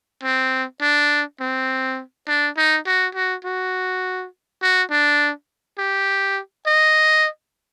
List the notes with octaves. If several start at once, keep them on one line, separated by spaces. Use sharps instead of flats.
C4
D4
C4
D4
D#4
F#4
F#4
F#4
F#4
D4
G4
D#5